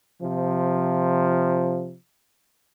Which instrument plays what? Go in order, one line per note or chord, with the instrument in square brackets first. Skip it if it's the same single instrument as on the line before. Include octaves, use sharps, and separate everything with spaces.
[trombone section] C3 F3